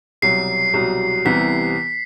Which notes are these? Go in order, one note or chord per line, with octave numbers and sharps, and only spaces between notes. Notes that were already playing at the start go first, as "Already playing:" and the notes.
C2 B2 F#3 C7
C2 B2 F#3
C2 C3 E3 B3 B6